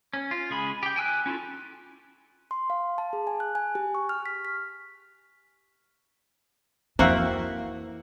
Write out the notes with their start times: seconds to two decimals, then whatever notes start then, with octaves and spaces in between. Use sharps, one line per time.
0.13 C#4
0.31 F4
0.50 C#3 G#3 G#4 B5
0.83 G4 G5
0.96 G5 G#5 E6 F#6
1.26 C#4 E4 F4 A4
2.51 C6
2.70 F5
2.98 A5
3.13 G#4
3.27 G#5
3.40 F#6
3.55 G#5
3.75 G4
3.95 C#6
4.09 F6
4.26 B6
4.45 B6
6.99 F2 E3 A#3 F#4 C5 E5 G5